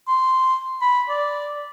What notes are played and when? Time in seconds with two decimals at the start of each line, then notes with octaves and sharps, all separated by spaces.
0.08 C6
0.81 B5
1.09 D5